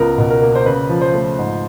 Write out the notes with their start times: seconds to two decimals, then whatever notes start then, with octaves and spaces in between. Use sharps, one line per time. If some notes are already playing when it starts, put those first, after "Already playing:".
Already playing: C#2 B3 A#4
0.18 B2
0.30 A#4
0.41 A#3
0.55 C5
0.66 C#3 B4
0.89 F3
1.01 C5
1.14 A3
1.38 G#2